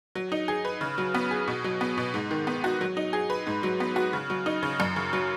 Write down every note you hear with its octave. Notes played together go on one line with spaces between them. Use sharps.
F#3
D#4
G#4
B4
C#3
F#3
B3
G#4
B2
F#3
B3
B2
G#2
D#3
B3
F#4
F#3
D#4
G#4
B4
G#2
F#3
B3
F#4
C#3
F#3
D#4
C#3
F#2
C#3
F#3